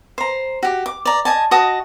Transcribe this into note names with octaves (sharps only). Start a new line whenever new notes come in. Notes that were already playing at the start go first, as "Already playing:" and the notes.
C5 A#5
F#4 G4
D6
D5 A#5
D#5 G#5 A5
F#4 D#5 A5 D#6